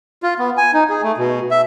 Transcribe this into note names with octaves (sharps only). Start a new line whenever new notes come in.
F4
B3
G#5
D#4
G#4
A3
B2
E5